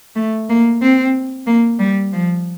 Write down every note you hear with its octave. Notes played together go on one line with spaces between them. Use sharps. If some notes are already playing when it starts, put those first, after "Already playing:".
A3
A#3
C4
A#3
G3
F3